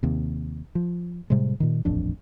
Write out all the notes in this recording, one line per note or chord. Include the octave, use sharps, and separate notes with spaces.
D#2 C3
F3
A2 C3 G3 G#3
A#2 D#3
D#1 A1 F2 D4